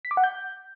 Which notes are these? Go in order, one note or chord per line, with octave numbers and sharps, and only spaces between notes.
B6
D6
F#5
G6